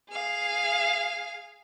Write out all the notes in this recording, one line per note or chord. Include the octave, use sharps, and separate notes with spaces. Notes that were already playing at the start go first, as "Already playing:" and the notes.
G#4 F5